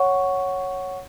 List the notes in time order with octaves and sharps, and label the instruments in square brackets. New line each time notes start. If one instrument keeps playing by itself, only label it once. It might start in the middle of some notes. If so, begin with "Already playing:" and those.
Already playing: [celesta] C#5 F#5 C#6